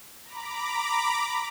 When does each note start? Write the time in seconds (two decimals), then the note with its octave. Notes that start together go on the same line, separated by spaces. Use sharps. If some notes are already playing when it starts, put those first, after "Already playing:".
0.24 A#5 B5 D6